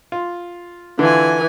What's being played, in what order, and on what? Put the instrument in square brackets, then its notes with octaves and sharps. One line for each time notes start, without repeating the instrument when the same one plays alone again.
[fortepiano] F4
[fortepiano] D3 F4 [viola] E3 G#5